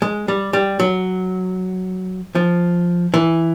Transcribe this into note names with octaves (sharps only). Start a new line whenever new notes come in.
G#3
G3
G3
F#3
F3
E3